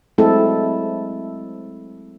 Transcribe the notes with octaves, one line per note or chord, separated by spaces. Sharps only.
F#3 G#3 A3 C4 E4 A4